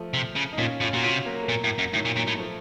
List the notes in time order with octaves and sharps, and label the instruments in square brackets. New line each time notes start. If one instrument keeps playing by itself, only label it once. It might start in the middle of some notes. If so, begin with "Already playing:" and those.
Already playing: [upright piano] F3 A3
[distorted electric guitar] C3
C#3
[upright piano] D#4
[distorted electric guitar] A#2 [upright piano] C#4 F4
[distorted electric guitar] A2 [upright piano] C#4 F4
[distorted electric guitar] A#2 [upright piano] F#4
[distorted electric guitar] C3 [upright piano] C#4 F4
[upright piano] F#3 A#3
A3
[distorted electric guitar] A#2 [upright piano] F#3 A#3
[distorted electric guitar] A2
F#2
[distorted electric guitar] A2 [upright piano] D#3 F#3
[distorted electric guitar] A#2
[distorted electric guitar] A#2 [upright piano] D#3 F#3
[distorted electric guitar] A2
[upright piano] F3 A3